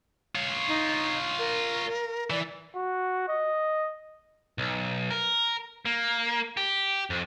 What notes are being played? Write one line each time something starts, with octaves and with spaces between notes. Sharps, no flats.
F4 C#5
D#4
A#4
E3 D5
F#4
D#5
B1
A#4
A#3
G4
F2